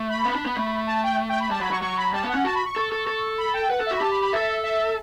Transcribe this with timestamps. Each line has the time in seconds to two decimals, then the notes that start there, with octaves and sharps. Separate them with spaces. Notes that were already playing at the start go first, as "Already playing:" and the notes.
Already playing: A3
0.10 B5
0.25 B3
0.35 D4
0.46 B3
0.57 A3
0.87 A5
1.03 G5
1.29 G5
1.40 B5
1.50 G3 A5
1.61 F#3 B5
1.71 F#3 C#6
1.82 F#3 C#6
1.97 B5
2.13 G3 A5
2.23 B3
2.29 F#5
2.35 C#4
2.44 F#4 A5
2.55 B5
2.65 C#6
2.76 A4
2.92 A4
3.07 A4
3.38 B5
3.54 G5
3.70 B4 F#5
3.81 A4
3.86 F#4 E5
3.97 B5
4.01 G4 A5
4.11 B5
4.22 B5
4.33 A4 E5
4.64 E5